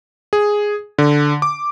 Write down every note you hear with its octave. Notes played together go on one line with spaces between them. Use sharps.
G#4
D3
D6